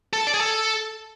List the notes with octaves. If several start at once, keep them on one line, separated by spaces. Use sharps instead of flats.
A4
A5
D5
G#4
A4